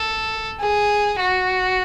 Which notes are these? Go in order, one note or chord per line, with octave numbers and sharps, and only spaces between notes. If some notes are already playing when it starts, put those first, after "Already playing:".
Already playing: A4
G#4
F#4